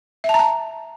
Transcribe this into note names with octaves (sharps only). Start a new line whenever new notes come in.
E5
A5
A#5
A5